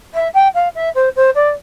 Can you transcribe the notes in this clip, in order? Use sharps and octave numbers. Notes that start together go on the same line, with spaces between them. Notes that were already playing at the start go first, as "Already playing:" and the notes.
E5
G5
F5
E5
C5
C5
D5